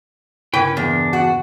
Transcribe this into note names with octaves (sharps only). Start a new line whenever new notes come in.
G2 C#3 C#4 E4 B4 G5
E2 D4
F#4